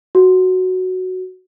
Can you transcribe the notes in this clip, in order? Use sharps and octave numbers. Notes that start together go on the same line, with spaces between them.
F#4